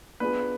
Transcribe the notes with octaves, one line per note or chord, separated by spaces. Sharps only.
B3 D4 F4 G#4 B4